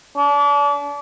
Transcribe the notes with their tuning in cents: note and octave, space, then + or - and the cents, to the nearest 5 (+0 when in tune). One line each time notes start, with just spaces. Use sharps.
D4 -35